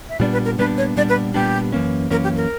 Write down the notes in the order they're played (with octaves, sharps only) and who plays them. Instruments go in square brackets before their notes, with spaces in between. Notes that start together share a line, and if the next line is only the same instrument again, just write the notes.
[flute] E5
[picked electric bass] A#2 G3 B3 D4 [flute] D5
[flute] B4
A#4
[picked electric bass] A#2 G3 B3 D4 [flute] B4
[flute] C#5
[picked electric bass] A#2 G3 B3 D4 [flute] D5
[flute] B4
[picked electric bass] A#2 G3 B3 D4 [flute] G4
[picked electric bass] F#2 E3 A#3 C#4
[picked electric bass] F#2 E3 A#3 C#4 [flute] A#4
[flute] G4
A#4